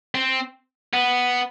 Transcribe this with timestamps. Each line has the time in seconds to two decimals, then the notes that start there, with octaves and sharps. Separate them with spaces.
0.15 C4
0.94 B3